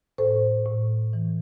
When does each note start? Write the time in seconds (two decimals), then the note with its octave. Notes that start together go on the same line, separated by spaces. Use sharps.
0.18 A2 A4 C5
0.66 A2
1.13 E3